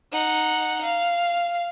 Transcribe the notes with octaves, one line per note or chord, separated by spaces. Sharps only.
D#4 F#5
F5